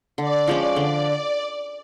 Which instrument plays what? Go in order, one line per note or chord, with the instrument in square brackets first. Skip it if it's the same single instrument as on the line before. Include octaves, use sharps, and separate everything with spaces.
[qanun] D3 [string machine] D5
[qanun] F3 G#3 C#4
[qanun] D3 [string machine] D5